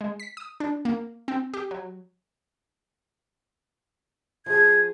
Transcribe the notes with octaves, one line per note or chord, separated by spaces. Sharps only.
G#3
B6
D#6
D4
A#3
C4
G4
F#3
F3 G#4 G#6